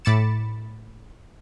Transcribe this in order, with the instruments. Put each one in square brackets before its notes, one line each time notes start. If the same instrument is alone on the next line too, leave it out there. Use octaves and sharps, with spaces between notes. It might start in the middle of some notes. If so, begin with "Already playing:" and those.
[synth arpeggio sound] A2 B5 D6 A6 C#7 E7